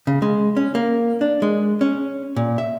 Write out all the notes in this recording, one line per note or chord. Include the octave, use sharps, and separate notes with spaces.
C#3
G#3
C#4
A#3
D4
G#3
C#4
A#2
E5